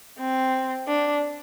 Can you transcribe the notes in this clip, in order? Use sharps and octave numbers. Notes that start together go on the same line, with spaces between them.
C4
D4